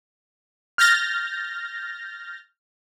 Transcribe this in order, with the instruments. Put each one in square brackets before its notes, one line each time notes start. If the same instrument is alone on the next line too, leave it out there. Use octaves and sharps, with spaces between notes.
[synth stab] F6 G6 A6 A#6